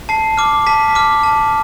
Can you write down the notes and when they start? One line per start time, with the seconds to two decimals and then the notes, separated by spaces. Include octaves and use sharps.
0.09 A5 C7
0.38 D6 F6
0.67 A5 B6
0.95 D6 F6
1.23 A5